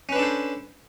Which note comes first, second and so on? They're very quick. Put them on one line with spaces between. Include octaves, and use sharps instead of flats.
C#4 B4 D4 A4 C5